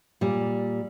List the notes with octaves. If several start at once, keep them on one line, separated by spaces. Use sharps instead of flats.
A#2 G3